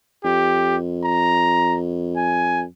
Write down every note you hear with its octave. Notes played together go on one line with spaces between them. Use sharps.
F2 G4
A#5
G#5